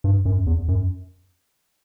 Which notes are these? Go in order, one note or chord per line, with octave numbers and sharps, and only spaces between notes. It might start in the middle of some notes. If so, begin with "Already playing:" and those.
G2
F#2
E2
F#2